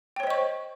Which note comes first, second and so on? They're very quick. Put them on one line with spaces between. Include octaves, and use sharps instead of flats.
G5 C#5 C5 D#5 C#6